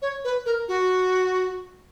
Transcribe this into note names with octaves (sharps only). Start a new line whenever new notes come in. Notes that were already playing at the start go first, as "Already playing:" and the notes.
C#5
B4
A#4
F#4